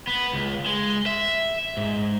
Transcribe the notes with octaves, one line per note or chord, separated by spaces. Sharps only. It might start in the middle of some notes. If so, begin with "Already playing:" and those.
B3
C#2
G#3
E5
G#2